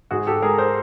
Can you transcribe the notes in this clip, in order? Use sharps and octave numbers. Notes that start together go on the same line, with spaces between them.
G#2 F#4 G#4
G4 A4
G#3 G#4 A#4
A#4 C5